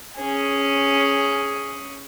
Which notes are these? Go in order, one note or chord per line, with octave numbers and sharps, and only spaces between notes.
C#4 G#4